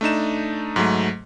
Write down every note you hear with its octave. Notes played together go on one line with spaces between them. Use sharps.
A3 D4 D#4 E7
G#2 F#3 A3